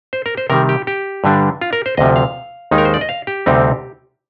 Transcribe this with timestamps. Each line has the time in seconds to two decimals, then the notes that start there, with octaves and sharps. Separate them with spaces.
0.13 C5
0.26 A#4
0.37 C5
0.50 C3 D#3 G3 A#4
0.69 G4
0.87 G4
1.24 G2 D3 G3 D4
1.61 F4
1.73 A#4
1.86 C5
1.97 D2 C3 F3 D#5
2.16 F5
2.71 D#2 D#3 G#3 D#4
2.78 A#4
2.85 C5
2.94 D5
3.01 D#5
3.09 F5
3.27 G4
3.46 D2 C3 G3 C4 D#4